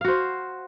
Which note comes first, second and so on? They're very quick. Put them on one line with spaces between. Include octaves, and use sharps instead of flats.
F5 F#4 C5